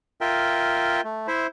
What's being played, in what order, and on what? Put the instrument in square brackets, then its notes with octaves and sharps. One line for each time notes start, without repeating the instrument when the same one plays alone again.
[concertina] F4 A#4 E5 G5
A3
E4 C5 E5